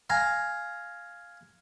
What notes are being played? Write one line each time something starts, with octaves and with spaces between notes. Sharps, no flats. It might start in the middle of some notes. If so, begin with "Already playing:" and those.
F5 G#5 A#5